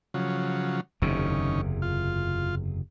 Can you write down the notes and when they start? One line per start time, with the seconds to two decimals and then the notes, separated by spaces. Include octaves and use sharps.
0.14 C#3 F3 F#3
1.02 F#1 E2 C3 D#3 C#4
1.82 F4